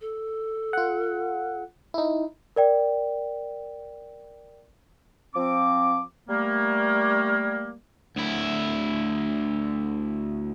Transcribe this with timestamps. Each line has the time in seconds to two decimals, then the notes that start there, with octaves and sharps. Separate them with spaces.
0.01 A4
0.73 F4 F#5
1.94 D#4 E4
2.56 A#4 D5 G5
5.35 F3 C4 D6
6.28 G3 A3 A#3
8.16 D2 E4